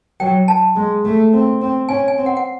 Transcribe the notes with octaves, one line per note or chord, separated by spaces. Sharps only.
F#3 G5
A5
G#3
A3
C4
C4
C#4 G#5
G#5
C4
F#5
F#5